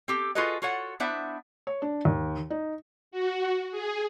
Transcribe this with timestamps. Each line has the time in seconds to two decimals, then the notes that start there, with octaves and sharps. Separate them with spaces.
0.08 C4 G4 A4
0.35 F4 F#4 G#4 A4 B4 D#5
0.62 F4 F#4 A4 C#5 F#5
1.00 B3 D4 E4 C5 E5 F#5
1.67 C#5
1.82 D4
2.05 D#2
2.50 D#4
3.11 F#4
3.71 G#4